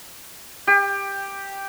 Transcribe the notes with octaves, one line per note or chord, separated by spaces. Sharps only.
G4